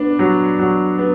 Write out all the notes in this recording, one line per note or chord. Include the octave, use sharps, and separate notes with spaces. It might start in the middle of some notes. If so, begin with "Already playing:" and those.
Already playing: B3 D4
F#3
F#3
B3